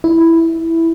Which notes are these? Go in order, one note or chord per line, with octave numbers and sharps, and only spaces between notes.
E4